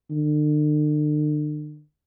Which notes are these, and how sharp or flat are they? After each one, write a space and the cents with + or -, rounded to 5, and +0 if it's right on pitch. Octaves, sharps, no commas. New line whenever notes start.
D3 +40